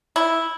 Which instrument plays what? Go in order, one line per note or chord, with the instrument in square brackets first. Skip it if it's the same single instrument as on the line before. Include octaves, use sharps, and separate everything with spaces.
[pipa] E4